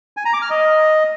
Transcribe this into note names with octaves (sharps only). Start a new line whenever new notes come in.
G#5
A#5
D6
F6
D#5